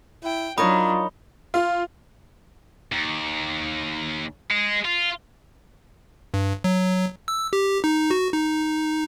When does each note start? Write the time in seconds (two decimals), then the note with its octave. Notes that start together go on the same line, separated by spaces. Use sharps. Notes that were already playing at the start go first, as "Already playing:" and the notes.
0.24 E4 G5
0.58 F#3 D4 D#4 F4 A#4 C#5 B5 D#6
1.54 F4
2.92 D#2
4.51 G#3
4.85 F4
6.34 G2
6.64 F#3
7.28 E6
7.53 G4
7.84 D#4
8.11 F#4
8.33 D#4